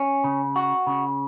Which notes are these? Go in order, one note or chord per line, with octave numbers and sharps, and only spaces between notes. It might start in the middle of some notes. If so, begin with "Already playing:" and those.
Already playing: C#4
C#3
F#4
C#3